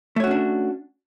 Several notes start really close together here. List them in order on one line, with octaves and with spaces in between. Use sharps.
A3 C#5 F#4 C#4 D4